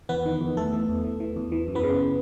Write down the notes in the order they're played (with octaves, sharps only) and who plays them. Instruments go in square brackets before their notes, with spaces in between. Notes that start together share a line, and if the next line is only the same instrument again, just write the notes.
[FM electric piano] E2 B3 B4
D#3
E2
E2 A3 A4
E3
E2
E3
E3
E2
E3
F#2
B3 B4
C#3